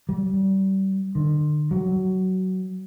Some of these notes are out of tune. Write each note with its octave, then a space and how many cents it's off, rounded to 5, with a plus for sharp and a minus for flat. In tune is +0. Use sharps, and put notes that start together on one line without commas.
G3 -30
D3 +40
F#3 +15